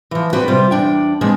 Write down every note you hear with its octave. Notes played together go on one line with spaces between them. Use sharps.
E3 F3
C4 D4 F#4 B4 G5
C3 G3 F4 C5
E2 D4 G5
F3 G#3 B3 C4 D4